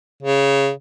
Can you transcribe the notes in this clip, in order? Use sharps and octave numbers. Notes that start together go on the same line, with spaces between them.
C#3